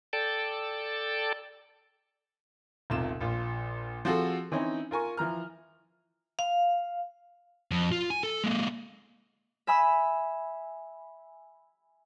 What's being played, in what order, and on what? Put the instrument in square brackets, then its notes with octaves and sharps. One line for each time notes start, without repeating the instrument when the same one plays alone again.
[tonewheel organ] A4 D5 G5 A5
[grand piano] E1 B1 C3 F4 E7
A#1 F4
F3 C4 F4 F#4 G#4 A4
E3 C4 C#4 D#4
F4 A#4 G#5 C#6
E3 F3 A#5 F6
[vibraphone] F5
[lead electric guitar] F2
F4
G#5
A4
G#3 A#3
[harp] E5 G#5 B5 E6